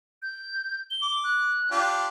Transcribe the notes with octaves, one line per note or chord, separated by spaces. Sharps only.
G6
G7
D6
F#6
D4 F4 G4